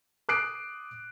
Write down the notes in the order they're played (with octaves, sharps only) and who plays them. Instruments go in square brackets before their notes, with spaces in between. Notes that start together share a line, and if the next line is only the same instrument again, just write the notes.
[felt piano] D6 D#6 F#6 C7 D7